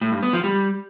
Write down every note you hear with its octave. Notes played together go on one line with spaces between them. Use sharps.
A2
G2
B3
F3
G3